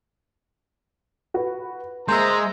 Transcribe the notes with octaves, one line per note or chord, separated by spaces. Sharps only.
F#4 B4
G#3 A#3 C5 E5 A#5